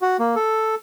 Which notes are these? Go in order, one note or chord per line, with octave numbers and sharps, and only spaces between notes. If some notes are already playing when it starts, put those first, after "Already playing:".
F#4
A#3
A4